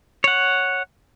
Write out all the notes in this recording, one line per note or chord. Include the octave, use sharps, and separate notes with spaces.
C#5 F#5